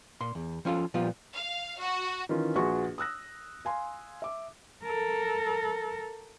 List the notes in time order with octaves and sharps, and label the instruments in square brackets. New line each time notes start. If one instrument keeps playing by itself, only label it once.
[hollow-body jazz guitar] A#2 C6
E2
F3 C#4 F4 A4
A#2 F3 G3 B3 F4
[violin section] F5
F#4
[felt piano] D#3 E3 C#4 F4
A#1 F#4 G#4 B4 C6 C#6
D#6 E6 F#6 A#6
F5 G#5 C6
E5 D6
[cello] A4 A#4